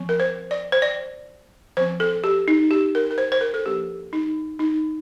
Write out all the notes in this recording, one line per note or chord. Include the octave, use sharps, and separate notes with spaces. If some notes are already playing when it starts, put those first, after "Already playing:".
Already playing: F3 C4
A#4
C5
D5
C5
D5
F3 C4 C5
A4
G4
D#4
G4
A#4
A#4
C5
C5
A#4
A4
F3 A#3 D4 G4
D#4
D#4